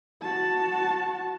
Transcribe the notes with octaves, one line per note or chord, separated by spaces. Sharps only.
F#4 A5